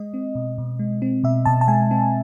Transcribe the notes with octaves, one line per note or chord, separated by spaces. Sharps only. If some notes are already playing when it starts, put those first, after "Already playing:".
Already playing: G#3 D#5
C4
B2
B2
G#3
C4
B2 E5
B2 A5
A5
G#3 G#5
C4